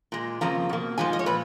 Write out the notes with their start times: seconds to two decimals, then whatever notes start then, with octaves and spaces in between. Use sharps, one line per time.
0.12 A#2 G#3
0.41 F2 C#3 F3 A#3 A#5
0.69 B2 A#3
0.98 G#2 F3 G#3 G#5
1.13 D#5
1.19 C#5
1.26 A#2 B4